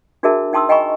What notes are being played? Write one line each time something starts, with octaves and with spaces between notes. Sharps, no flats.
D4 F#4 G#4 A#4 E5 A5
D#4 G5 A5 C6 D#6 E6
D#5 G5 G#5 A#5 B5 C#6